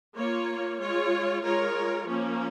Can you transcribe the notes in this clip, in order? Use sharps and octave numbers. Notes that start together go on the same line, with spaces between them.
A#3 F4 C#5
G#3 F4 C#5
G#3 F4 A#4 C#5
F3 A#3 C#4